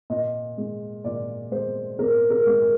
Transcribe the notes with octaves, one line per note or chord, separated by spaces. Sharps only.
A#2 D#5
G#3
A#2 D5
G#3 C5
A#2 A#4
A#4
G#3
G#4